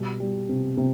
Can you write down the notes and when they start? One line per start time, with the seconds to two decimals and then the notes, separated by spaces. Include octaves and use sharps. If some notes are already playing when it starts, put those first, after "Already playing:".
Already playing: B2 G3
0.20 G3
0.49 C3
0.77 C3